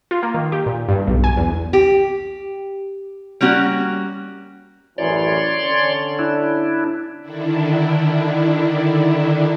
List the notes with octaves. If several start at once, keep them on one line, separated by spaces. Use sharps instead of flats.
F4
A#3
D#3
G4
A#2
G2
B1
G#5
E2
G4
G3 A#3 C#4 F#4
A1 F#2 E3 C#5 D5 C6
D3 C#4
D4 E4
D3 D#3 D4 E4